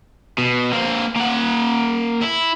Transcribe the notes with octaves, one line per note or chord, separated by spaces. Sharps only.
B2
A#3 C4
A#3 F#5
E4